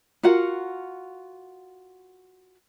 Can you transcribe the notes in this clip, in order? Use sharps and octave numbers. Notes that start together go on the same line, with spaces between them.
F4 F#4 A#4 F#5